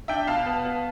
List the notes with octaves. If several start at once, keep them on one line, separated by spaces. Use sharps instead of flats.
D4 E5 G5
B2 F5 A5
B3
B3